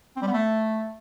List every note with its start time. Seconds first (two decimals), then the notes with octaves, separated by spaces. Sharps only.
0.16 C4
0.22 G3
0.28 B3
0.33 A3